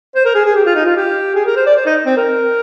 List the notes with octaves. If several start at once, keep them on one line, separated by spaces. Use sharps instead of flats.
C5
A#4
G#4
G#4
G4
F4
D#4
F4
G4
G#4
A#4
C5
D5
C5
D#4
C4
A#4